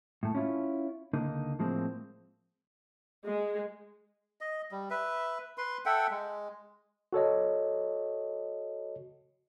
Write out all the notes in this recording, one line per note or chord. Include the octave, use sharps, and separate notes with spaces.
A2 A3
C#4 E4 F4
C#2 D3 A#3 D#4
A2 F3 G#3 A#3 C4
G#3
D#5
G3
B4 E5
B4 C6
A4 E5 F#5 G5
G#3
F#4 A4 C#5 D#5